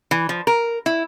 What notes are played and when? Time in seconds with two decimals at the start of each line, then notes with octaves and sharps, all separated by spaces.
0.11 E3
0.29 F3
0.47 A#4
0.86 E4